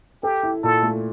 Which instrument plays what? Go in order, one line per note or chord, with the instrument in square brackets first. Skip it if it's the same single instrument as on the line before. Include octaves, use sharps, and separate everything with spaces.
[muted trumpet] G4 [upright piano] A4
[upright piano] E4
[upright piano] A#2 [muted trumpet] A4
[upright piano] A3